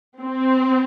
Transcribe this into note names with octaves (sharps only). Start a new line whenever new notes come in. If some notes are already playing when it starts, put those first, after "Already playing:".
C4